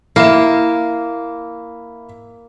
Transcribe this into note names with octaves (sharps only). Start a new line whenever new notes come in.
A#3 E4 E5 E7